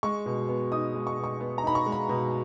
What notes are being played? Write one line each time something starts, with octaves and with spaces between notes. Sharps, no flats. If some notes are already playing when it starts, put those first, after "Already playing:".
G#3 C#6
B2
B3
D#4 D#6
G#3
C#6
B2
C#6
B3
A#5
D#4 B5
C#6
G#3
B5
B2